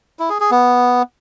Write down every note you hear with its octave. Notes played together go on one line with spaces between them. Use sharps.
E4
G#4
G#4
B3